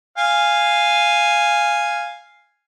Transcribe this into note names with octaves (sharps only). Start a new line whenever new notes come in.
F5 G#5